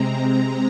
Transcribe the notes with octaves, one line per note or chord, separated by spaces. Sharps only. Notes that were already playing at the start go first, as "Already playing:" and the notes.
Already playing: C3 G#3 C4 A#5